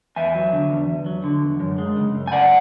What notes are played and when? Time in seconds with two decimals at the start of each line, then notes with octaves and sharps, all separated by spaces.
0.16 E2 E5 G#5
0.35 F#3
0.53 D3
0.71 E2
0.89 E2
1.06 F#3
1.24 D3
1.42 E2
1.60 F#2
1.78 G#3
1.97 C#3
2.15 F#2
2.27 G#5
2.32 F#2 D5 F#5